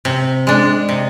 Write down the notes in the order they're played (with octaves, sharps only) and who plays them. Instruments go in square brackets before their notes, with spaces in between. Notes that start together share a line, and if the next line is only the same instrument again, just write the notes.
[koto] C3
G#3 D4
C3